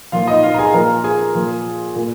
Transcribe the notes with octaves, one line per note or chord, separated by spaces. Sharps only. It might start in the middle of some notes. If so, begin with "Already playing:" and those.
A#2 F3 F4 F5
D#4 D#5
F4 F5
A#5
G#4 G#5
A#2 F3 A#4 A#5
G#4 G#5
A#2 F3
A#2